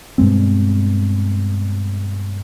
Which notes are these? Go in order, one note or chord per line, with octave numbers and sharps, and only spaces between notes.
G2 B2 G#3 C4